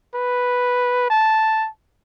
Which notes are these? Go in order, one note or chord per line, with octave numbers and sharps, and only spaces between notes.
B4
A5